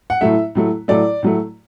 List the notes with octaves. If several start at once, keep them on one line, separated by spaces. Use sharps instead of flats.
F#5
A2 F#3 A3 E5
A2 F#3 A3
A2 F#3 A3 D5
A2 F#3 A3